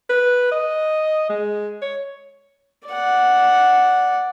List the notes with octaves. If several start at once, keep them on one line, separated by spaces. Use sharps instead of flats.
B4
D#5
G#3
C#5
D5 F#5